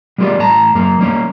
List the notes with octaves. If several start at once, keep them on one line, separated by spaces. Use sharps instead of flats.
G3 G#3 A#3 F4 G4 D5
A2 A5 A#5
F#2 A#3 A#5
G3 A#3 C#4